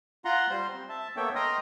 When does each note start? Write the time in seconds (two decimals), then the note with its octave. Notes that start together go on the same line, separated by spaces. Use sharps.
0.25 F4 F#5 A#5 C6
0.50 G3 C5 C6
0.73 C4
0.89 E5 A5
1.17 A#3 B3 A4 C#5 E5 G5
1.35 D#5 G5 A#5 C6 D#6 F6